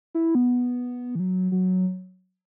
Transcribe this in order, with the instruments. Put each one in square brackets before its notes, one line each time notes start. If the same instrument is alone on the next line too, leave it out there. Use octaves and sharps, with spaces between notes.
[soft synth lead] E4
B3
E3
F#3
F#3